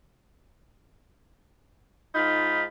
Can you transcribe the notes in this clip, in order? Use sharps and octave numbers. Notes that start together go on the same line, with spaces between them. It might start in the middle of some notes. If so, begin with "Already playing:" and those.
G#2 D#4 F4 B5